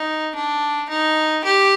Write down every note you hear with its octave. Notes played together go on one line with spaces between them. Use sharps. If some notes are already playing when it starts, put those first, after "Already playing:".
Already playing: D#4
D4
D#4
G4